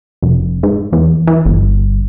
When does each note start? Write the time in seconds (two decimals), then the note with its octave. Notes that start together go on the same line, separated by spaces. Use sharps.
0.22 F1
0.63 G#2
0.93 E2
1.27 E3
1.45 G1